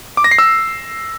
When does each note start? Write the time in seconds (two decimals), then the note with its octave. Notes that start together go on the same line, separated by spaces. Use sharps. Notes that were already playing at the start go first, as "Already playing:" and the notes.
0.17 D6
0.24 A#6
0.31 C7
0.38 E6